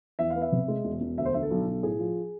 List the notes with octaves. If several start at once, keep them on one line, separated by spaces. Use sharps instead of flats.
E2 E5
B3 F5
E5
C3
G#3
E1
E1
D2 E5
C5
D3 E5
A4
B1
B1
A2 G#4
F3